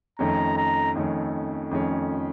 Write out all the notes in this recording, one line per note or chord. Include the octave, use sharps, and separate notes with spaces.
F2 D#3 A3 C#4 A#5
A#5
F2 D#3 A3 C#4
F2 D#3 A3 C#4